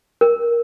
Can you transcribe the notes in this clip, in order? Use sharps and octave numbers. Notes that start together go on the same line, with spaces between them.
A#4